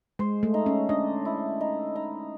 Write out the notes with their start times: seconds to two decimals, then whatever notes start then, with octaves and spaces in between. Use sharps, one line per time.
0.19 G#3 C5
0.43 A3
0.54 D#4
0.66 C#4
0.89 D4 D#5
1.25 E4
1.61 D#4
1.96 D#4